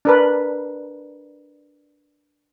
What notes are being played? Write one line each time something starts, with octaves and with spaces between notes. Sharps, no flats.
D4 A#4 B4